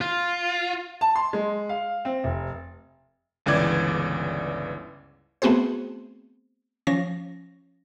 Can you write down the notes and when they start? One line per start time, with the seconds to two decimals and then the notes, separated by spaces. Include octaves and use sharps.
0.01 F4
1.01 A5
1.16 C6
1.33 G#3
1.69 F5
2.05 C4
2.24 F1
3.46 G1 C#2 E3 D5 G#6
5.42 A3 B3 C4 F#4 G#4 C5
6.87 F3 C#4 A#6